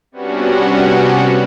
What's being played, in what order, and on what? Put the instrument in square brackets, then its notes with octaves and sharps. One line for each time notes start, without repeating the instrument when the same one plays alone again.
[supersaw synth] C3 G3 B3 C#4 D4 F#4